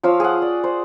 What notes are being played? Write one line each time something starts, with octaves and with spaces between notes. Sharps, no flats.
F3 C#5 F5 E6
G#4 F#5
D5
C5